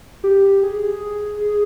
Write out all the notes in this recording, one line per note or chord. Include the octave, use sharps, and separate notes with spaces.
G4
G#4